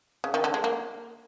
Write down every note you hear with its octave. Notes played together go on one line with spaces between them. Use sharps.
C#3
D#3
D3
G#3
A#3